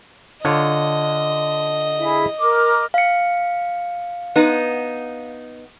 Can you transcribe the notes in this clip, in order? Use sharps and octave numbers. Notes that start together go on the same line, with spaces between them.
D3 F4 C#5 D#5
E4 G#4 E5
A#4 D6
F5 C#7
B3 D#4